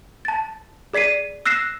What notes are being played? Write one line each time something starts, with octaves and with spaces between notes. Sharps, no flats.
A5 A6
G#4 D5 B6 C7 D#7
E6 F#6 A#6 C7 E7